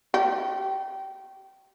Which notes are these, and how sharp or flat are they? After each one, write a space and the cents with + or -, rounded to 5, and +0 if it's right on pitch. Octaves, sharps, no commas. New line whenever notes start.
G4 -20